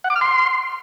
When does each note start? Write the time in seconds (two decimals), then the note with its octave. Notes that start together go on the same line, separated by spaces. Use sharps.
0.04 F#5
0.10 D6
0.16 F6
0.21 C6